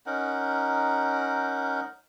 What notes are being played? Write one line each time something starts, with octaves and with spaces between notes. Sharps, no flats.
C#4 D#4 A#4 F#5